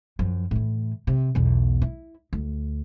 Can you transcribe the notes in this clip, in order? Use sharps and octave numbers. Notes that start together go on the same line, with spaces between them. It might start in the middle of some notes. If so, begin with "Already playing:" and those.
F#2 F3
A2 E3
C3
B1 E2
E4
D2